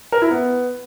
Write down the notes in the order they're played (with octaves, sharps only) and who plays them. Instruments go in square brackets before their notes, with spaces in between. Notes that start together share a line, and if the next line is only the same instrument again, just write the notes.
[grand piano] A#4
E4
B3